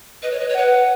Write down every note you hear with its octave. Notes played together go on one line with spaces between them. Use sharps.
B4 D#5
C#5
B4 D#5
C#5
B4 F#5